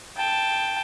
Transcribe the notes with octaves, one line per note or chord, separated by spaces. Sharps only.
G5 A5